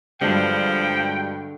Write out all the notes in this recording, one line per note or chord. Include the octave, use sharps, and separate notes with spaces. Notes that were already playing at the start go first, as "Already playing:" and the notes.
G2 D3 F3 F#3 G#3 G5